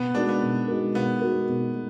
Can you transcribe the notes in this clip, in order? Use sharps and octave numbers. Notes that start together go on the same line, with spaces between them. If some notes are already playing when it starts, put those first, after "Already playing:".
Already playing: B2 B3
G#3 D4 D#4 F#4 A#4
B3
B2
G#3 D#4 F#4 A#4
B2 B3
G#3 D#4 F#4 A#4
B2
G#3